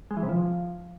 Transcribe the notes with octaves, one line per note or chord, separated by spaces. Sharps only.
G#3
E3
C3
F3